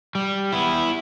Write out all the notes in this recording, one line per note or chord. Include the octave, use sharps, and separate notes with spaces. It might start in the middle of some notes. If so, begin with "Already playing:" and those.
G3
B3 E4